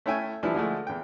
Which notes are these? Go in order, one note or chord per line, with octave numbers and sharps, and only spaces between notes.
A3 C#4 E4 E5 G5 G#5
E3 F3 G3 D4 E4 A5
D3 F3 G#3 A3
E2 G5